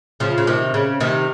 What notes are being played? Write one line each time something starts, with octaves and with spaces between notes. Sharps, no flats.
C#3 F3
C#3
C3 D#3
C#3
C3 D#3